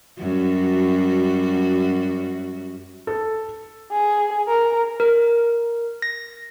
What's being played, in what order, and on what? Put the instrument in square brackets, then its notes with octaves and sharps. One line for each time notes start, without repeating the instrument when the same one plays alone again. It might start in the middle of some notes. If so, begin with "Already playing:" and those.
[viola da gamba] F#2 G3 F#4
[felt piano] A4
[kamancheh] G#4
A#4
[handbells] A#4
A#6